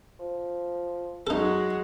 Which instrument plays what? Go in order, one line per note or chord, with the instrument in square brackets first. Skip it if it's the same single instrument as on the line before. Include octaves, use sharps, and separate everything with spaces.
[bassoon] F3
[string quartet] F#3 G#3 F#4 [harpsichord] D#4 A4